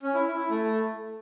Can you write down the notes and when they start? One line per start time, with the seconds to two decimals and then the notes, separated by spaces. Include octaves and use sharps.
0.03 C#4
0.15 E4
0.26 E4
0.38 E4
0.49 A3